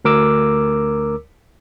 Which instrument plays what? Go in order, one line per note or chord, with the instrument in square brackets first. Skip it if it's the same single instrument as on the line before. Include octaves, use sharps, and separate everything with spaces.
[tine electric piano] D2 A#4 D6 E6